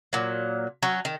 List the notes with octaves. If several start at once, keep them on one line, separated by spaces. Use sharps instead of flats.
A#2 F#3
F#3 C#4
D#3